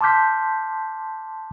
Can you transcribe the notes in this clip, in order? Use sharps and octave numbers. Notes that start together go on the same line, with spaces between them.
A5 C6 D6 F6 G6 B6